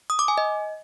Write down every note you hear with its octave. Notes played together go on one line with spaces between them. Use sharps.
D#6
D6
G#5
D#5